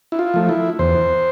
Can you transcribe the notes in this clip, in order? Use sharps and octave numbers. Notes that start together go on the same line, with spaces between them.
E4
F4
F3 A3
E4
E2 C5